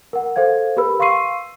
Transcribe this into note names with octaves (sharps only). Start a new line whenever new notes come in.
A#4 F#5
A4 C5 F5 G#6
G4 A#4 B4 B5 E6
F5 C6 C#6 E6 C7 D#7